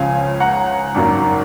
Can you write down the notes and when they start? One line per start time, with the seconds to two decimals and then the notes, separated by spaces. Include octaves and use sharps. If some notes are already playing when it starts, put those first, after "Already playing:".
Already playing: C#2 C#3 F3 F5 G#5
0.40 F#5 A#5
0.95 G#1 F#2 D#3 A#3